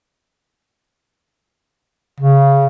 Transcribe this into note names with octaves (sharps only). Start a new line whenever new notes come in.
C#3